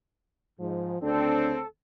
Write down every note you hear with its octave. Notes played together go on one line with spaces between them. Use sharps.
G#2 F3
D2 C#3 C4 D4 A4